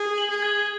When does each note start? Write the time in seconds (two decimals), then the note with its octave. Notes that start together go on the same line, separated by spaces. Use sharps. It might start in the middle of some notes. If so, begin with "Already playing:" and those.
Already playing: G#4
0.18 F#7
0.30 G#4
0.42 G#6